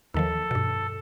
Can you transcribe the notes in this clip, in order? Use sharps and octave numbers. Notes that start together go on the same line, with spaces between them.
D#2 D#3 F3 A4
G2 B2